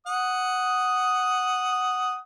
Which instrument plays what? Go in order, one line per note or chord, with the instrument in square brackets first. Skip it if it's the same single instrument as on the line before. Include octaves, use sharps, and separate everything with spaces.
[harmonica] F#5 D#6